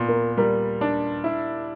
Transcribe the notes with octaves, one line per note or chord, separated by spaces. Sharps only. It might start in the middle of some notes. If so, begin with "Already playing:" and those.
Already playing: A#2 B3
A#4
G3 A#4
D4
E4